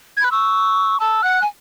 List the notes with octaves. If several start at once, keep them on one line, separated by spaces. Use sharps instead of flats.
G#6
B5 F#6
C#6 E6
A5 E6
F#5 F#6
G#5